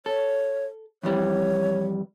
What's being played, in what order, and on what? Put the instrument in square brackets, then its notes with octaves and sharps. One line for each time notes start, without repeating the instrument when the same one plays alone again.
[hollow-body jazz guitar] A4 [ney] C#5
[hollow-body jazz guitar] F2 E3 G3 [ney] C#5